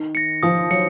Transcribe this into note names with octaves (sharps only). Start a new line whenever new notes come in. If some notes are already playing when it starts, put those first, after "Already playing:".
Already playing: D#3
A#6 C#7
F3 D#6
F#3 C#7